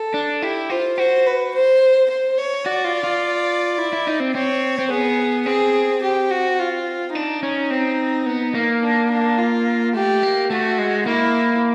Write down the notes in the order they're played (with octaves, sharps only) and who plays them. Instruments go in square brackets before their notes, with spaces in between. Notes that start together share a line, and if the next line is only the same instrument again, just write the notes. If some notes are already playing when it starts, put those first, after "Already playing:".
Already playing: [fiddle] A4
[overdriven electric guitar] D4
[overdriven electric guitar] E4 [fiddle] G4
[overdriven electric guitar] F4 [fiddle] C5
[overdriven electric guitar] F#4 [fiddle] C5
[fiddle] B4
C5
C5
C#5
[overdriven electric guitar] F#4 [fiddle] D5
[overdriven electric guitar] F4
F4
E4
E4
D#4
C4
[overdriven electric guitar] C4 [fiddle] C#5
[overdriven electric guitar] C4
[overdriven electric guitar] B3 [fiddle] G#4
[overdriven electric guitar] C4 [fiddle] G#4
[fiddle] G4
F#4
F4
[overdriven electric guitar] D4 [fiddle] D#4
[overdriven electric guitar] C#4
C4
B3
A#3
[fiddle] D4
D4
F4
[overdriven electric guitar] A3 [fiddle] G4
[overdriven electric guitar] A#3
[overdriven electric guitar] A3 [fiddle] F#4
[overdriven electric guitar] G#3
[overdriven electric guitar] A#3 [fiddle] E4